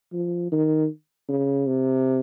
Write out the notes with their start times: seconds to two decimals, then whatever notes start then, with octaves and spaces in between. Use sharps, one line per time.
0.13 F3
0.52 D#3
1.29 C#3
1.66 C3